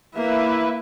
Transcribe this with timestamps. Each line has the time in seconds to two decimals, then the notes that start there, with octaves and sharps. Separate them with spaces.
0.15 A#3 E4 B4 E5